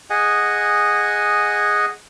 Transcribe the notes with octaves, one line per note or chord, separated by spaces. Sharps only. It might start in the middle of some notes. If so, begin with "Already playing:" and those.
G#4 D#5 F#5 G#5